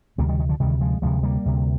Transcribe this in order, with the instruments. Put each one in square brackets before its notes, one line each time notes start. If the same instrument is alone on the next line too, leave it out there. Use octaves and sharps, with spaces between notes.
[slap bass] D2 C3 G3 A#3
D#3 G3
D#3
D3 F3
D2 C3 D#3 G3
F3 G#3
D2 C3 F3 G#3
G3 A#3
D2 C3